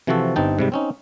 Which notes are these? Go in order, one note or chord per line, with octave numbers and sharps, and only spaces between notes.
C3 E3 F3 C4 F#4 A4
G1 G2 C4 D#4 G5 A5
G#2 C3 G3
C4 C#4 D#4